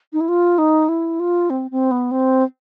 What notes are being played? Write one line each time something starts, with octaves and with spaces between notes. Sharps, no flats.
D#4
E4
F4
D#4
E4
F4
C4
C4
B3
C4